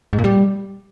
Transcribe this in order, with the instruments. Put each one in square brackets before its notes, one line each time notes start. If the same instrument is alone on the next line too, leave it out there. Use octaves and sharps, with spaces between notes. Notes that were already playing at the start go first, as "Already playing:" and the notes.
[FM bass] G#2
A#2
G3